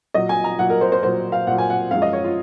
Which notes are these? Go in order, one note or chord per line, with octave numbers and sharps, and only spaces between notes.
A#2 F#3 D#5
G#5
A#5
A#2 F#3 F#5
A#4
C5
C5
A#2 F#3 C5
F5
A#2 F#3 F#5
G#5
F#5
F#2 F3 G#3 F5
D#5
C#5
F4